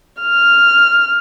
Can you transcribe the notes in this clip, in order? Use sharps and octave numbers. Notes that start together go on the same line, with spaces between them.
F6